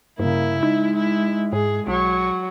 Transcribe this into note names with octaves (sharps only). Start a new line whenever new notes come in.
G2 C#3 A#3 E4
G#3 D#4
E4
G#2 G#4
B1 F#3